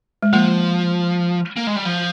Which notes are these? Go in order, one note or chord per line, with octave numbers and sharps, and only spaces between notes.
G#3
F3 A#3
A#3
G#3
G3
F3